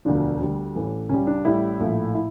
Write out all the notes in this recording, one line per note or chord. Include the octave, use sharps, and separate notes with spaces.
E1 D2 D3 F3 D4
D2 D3 G3
A1 A2 E3 A3
C#2 C#3 G3 C#4
D4
A1 A2 G3 E4
A#1 A2 F3 A3
E4